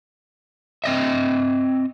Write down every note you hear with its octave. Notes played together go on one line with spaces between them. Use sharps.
C4 D#5 E5